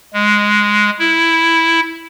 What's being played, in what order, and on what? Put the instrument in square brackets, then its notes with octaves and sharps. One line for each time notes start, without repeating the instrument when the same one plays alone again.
[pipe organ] G#3
E4